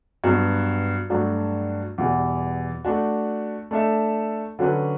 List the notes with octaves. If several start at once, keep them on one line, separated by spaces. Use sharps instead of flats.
G2 F#3 B3 F#4
G2 F#3 A3 D4 F#4
E2 B2 G3
A3 D4 F#4
A3 D4 A4 E5
D3 F#3 C#4 F#4 B4